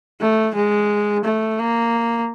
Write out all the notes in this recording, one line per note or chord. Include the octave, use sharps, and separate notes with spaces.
A3
G#3
A3
A#3